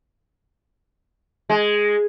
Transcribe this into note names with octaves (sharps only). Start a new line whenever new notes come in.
G#3